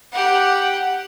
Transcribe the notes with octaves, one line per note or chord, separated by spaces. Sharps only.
G4 F#5